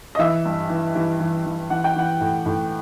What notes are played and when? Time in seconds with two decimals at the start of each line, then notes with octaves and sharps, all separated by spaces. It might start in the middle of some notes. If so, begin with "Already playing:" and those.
0.15 D#5
0.19 E3 E5
0.45 G2
0.69 E3
0.95 E3
1.20 E3
1.46 E3
1.70 E3 F#5
1.84 G5
1.96 E3 F#5
2.21 A2
2.46 A2